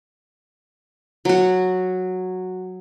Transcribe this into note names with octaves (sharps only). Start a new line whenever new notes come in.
F#3 F#4